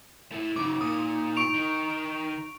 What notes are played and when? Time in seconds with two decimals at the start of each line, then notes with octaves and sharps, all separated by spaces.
0.32 A3 E4
0.56 F#2 C#3 D#4 D6
0.81 A#2 D#6
1.36 C#6 D7 F7
1.54 D#3